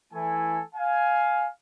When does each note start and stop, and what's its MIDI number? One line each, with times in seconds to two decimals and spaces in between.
0.13 0.62 52
0.13 0.62 57
0.13 0.62 64
0.13 0.62 69
0.13 0.62 80
0.75 1.47 77
0.75 1.47 80